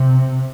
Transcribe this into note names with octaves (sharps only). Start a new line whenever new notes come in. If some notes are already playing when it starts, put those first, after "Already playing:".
Already playing: C3